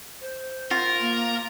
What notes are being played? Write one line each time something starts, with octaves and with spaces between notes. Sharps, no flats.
C5
F4 A#4
A#3